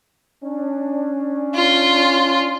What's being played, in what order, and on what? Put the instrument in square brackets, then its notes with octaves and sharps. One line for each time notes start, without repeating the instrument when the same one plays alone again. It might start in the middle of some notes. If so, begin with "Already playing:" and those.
[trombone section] C#4 D4
[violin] F4